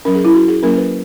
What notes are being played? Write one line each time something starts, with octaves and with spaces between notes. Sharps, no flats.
F#3 C#4 A#4
G#4
E4
F#4
G#4
F#3 A#3 C#4 A#4
B4